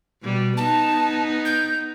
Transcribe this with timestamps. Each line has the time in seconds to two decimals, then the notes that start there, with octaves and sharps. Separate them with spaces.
0.22 B2 G3
0.57 B3 D#4 A5
1.45 G6